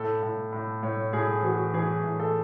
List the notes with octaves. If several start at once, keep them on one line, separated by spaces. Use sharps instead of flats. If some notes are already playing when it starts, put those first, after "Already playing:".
Already playing: A2 A4
A2
A2
A2 C#5
A2 G#4
E3 F#4
E3 G#4
A2
A4